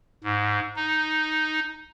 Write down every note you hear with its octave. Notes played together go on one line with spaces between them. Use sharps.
G#2
D#4